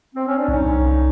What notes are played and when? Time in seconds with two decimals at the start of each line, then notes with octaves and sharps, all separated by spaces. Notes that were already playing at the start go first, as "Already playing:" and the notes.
0.15 C4
0.27 C#4
0.37 D4
0.48 C2 C#4 D#4
0.67 C2
0.86 C2